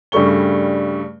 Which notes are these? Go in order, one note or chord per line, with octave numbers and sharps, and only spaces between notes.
G2 C#3 G3 A3 C#6 G7